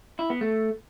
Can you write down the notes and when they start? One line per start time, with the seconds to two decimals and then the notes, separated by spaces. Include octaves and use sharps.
0.19 E4
0.30 B3
0.41 A3